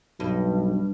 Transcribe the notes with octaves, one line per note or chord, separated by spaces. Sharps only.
B1 G2